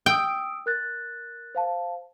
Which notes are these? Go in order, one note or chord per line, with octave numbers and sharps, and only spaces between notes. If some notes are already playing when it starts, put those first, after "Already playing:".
G5 D#6 E6 D7
A#4 F#6 A6
C5 F5 A5